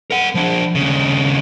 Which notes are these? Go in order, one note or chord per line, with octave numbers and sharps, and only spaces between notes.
A#4 F#5
F3 D4
D#2 C#3